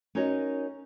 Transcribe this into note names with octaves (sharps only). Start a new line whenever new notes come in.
C#4 D#4 F#4 A#4 C#5 D#5